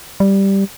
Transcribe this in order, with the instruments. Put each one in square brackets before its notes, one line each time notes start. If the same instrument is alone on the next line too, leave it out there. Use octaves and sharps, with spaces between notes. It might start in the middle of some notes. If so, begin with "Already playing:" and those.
[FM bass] G3